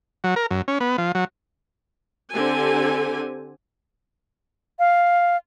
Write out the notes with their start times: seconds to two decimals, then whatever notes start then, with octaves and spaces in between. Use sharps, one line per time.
0.24 F#3
0.36 A#4
0.51 F#2
0.68 C#4
0.81 B3
0.98 F3
1.15 F#3
2.34 D3 C4 G4 A4 G#5
4.79 F5